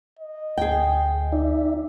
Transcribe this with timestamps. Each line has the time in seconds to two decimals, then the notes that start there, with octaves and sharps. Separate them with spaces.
0.19 D#5
0.58 D2 G#4 G5
1.32 D#4 D5 E5